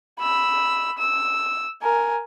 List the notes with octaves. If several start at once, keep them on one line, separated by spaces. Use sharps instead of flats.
B5 E6
E6
A#4 G#5